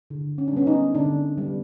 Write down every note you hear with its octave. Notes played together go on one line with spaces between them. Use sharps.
D3
C#4
D4
G3 B3 C#4
D#4
D3 D4
G3 B3